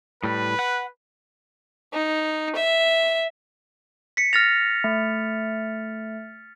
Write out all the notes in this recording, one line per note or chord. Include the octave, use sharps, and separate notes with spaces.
A2 G3 B4
F#5
D#4
E5
B6 C#7
F6 A6 A#6 F7
A3